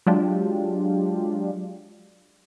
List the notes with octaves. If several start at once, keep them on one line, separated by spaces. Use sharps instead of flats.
F#3 G#3 D4 F4 G4